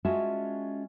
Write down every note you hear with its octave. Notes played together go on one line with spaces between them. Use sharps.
G#3 C#4 F4 F#4 E5 A5